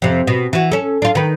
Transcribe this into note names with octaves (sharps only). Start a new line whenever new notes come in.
F2 C3
B2
E3 F#4
C#4 A4
D4 F4
D#3 B4